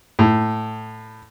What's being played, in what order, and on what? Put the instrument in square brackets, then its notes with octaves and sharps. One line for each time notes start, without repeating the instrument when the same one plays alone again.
[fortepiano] A2